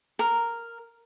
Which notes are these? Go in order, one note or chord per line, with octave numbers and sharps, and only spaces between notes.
A#4